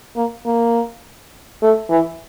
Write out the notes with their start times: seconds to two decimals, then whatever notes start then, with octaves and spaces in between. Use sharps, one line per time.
0.17 A#3
0.46 A#3
1.62 A3
1.90 E3